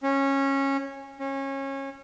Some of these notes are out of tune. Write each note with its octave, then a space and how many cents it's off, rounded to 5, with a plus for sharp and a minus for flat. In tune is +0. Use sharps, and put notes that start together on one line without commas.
C#4 -15
C#4 -25